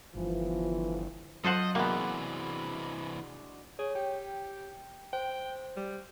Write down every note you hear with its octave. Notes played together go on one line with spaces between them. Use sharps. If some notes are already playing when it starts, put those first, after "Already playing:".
G1 E3 F3
F#3 F4 A4 C5 D#5 F#5
C3 E3 G#3 A#3 B3 D4 F#4
G#4 C#5
G4 G5
C5 G5
G3